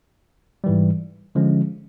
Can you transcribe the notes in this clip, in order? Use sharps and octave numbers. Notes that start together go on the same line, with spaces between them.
G#2 E3 G3
D3 F3 G#3 C#4